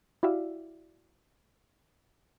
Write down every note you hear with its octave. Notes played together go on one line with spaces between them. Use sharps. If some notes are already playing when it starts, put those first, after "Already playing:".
E4 F#4 G4 D5 E5 F5